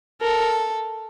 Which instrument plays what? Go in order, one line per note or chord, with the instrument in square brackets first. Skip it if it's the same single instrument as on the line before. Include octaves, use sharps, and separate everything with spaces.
[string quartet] A4 [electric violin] A#4